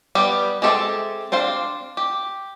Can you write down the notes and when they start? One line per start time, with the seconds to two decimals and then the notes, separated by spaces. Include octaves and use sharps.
0.15 G3 B3 G4
0.62 G#3 C4 G4 A4 E5
1.32 C4 D4 C5 F5
1.97 G4